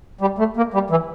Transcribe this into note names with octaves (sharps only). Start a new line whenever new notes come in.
G3
A3
A#3
G3
E3